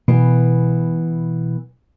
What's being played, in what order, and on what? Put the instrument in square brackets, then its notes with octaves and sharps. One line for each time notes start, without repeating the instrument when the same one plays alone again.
[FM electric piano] B2 [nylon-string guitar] E3 B3